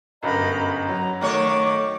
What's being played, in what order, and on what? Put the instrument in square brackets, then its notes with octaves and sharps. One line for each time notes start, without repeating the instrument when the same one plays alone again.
[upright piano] G1 F#2 [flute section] D#5 A#5 B5
[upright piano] F#3 [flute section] A#5
[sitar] D#3 A3 C#5 [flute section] D6